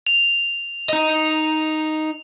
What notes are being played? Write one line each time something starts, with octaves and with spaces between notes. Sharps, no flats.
F7
D#4 D#5